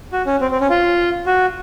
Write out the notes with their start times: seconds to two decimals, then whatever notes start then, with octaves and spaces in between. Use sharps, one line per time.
0.12 F#4
0.26 C#4
0.41 C4
0.51 C4
0.61 C#4
0.70 F4
1.26 F#4